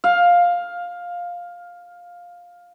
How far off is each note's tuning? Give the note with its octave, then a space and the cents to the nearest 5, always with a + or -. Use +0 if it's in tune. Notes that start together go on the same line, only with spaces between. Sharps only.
F5 +10